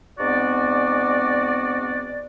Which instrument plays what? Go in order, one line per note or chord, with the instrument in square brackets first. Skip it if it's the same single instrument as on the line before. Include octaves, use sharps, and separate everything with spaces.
[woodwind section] G#2 B3 C4 F#4 D5